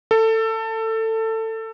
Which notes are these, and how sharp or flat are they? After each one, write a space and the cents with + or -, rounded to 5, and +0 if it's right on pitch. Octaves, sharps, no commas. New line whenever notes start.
A4 +20